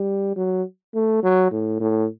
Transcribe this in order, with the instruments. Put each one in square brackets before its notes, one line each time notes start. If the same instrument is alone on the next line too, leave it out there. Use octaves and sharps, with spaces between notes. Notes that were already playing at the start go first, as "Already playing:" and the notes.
Already playing: [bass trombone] G3
F#3
A3
F#3
A2
A2